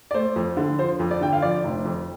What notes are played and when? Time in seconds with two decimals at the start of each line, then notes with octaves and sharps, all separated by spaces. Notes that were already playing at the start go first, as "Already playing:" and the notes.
0.11 D5
0.14 A3 C5
0.36 F2
0.57 D3
0.79 F3 C5
1.00 F2
1.11 D5
1.21 D3 G5
1.33 F5
1.42 F3 D5
1.64 F1
1.85 F2